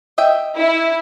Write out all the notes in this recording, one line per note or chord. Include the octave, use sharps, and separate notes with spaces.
D#5 E5 G5
E4